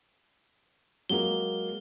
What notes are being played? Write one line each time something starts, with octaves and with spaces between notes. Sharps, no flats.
F#3 G#3 A#3 G7